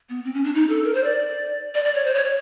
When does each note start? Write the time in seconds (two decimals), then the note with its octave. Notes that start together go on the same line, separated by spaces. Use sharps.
0.10 B3
0.24 C4
0.34 C#4
0.44 D4
0.54 D#4
0.69 A4
0.84 A#4
0.94 C5
1.04 D5
1.75 D5
1.85 D5
1.95 C#5
2.05 C5
2.14 C#5
2.25 C#5